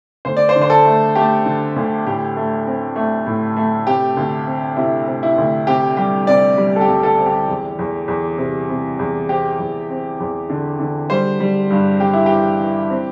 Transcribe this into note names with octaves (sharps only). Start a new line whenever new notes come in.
D2 C5
D5
C5
D3
C5
A4
A3
A3 G4
D3
D2
A2 G4
A3
C4
A3
A2
A3
C3 G4
D2
C4
C3 E4
C3
E4
D2
C3 G4
G3 G4
C3 D5
G3
A4
G4
C2
A4
C4
G4
E2
E2
E2
C3
C3
E2
C4 G4
E2
C4
E2
D3
D3
G3 C5
G3
G2
G3 G4
E4
E3 G4
E3
C4